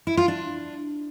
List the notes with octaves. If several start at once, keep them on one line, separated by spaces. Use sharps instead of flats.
E4
F4
D4